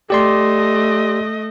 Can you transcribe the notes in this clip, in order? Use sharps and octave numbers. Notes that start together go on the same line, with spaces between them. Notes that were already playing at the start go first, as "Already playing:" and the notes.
A3 G4 D5 D#5 C6